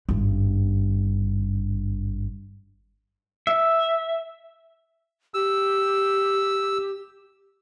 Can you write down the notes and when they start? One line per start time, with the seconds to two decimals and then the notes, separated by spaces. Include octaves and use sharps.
0.09 G#1 G2
3.47 E5
5.34 G4 E6